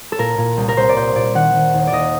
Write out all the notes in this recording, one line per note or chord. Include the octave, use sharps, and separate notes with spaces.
A4
A#2 A#4
A#2
C2
A#4
C2 C5
D5
A#2 C5
A#2 D5
D#3 F#5
D#3
D#2
D5
D#2 D#5